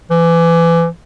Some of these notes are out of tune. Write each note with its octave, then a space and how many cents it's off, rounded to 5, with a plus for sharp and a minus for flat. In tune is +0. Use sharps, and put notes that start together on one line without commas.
E3 +25